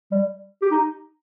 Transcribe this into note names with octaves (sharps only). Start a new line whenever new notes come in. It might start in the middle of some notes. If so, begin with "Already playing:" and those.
G3
G4
D#4